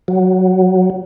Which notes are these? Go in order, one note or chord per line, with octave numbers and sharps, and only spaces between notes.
F#3